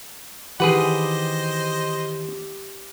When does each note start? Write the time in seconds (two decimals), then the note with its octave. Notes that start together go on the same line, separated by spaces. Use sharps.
0.60 D#3 E3 G4 G#4 B4 C5 D#5 F#5